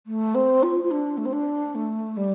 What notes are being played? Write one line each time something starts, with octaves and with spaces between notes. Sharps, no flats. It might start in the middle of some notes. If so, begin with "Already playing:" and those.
A3
C4
F4
F4
D4
A3
C4
D4
A3
G3